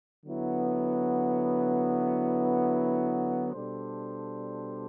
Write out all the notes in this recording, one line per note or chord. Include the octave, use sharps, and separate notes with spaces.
D3 F#3 B3 E4
B2 G3 D4 A4 C5